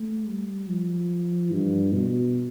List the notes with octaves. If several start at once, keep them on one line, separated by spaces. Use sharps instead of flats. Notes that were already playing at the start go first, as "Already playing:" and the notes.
Already playing: A3
G3
F3
G2
B2